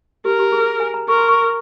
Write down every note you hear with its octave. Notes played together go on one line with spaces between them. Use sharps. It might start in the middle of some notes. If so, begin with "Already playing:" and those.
G4 A#4
G4
G#4
G#5
A#5
A#4 C#6
C6
C#6